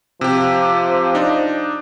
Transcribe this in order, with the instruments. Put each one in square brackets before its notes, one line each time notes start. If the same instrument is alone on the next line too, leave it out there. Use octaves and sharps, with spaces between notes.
[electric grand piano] C3 G4 [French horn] F3
[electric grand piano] D4 D#4